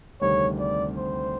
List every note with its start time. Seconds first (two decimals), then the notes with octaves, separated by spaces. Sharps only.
0.21 D2 C3 D#3 G3 C4 C#5
0.60 D5
0.97 C5